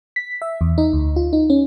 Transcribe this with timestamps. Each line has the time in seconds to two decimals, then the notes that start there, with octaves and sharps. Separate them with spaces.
0.16 B6
0.42 E5
0.61 E2
0.78 D#4
0.93 D2
1.16 F4
1.33 D#4
1.50 C#4